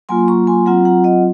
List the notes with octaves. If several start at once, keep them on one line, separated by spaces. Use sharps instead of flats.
F#3 A#3 F4 G#5 C6
A#5 C#6
G#5 C6
F#3 C4 F4 F#5 A#5
F#5 A#5
D#5 F#5